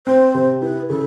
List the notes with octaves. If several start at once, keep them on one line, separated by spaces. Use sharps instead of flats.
C4 C5
C3
E4 B4
C#3 A4